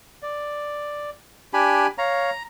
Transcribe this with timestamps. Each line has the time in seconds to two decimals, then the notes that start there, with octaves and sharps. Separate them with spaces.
0.22 D5
1.53 D4 G4 G#5 B5
1.98 C#5 F5 A#5